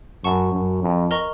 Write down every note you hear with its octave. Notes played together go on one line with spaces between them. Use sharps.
F#2 F#5 A5 C#6
F#2
F2
A#4 D#5 A#5 C#6